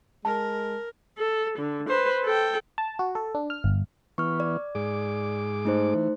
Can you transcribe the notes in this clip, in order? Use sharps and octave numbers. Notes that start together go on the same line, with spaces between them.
G#3 A#4 A5
A4
D3
B4 C5
A4 G5
A5
F#4
A4
D4
F6
G1
E3 B3 C#6 F6
D5
G#2 G#4 D6
A3 D#4 C5
E3